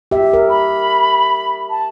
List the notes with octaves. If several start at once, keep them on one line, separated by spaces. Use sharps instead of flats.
G4 E5
A#4
B5
A5